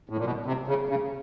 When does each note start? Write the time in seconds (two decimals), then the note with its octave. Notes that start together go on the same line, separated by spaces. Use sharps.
0.10 A2
0.17 A#2
0.25 B2
0.46 C3
0.68 C#3
0.89 C#3